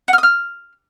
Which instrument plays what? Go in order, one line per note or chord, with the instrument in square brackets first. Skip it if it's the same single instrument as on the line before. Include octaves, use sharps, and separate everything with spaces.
[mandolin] F#5
F6
D#6
F6